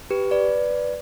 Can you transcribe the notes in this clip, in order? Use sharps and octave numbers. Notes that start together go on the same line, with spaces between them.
G4 B4
B4 D5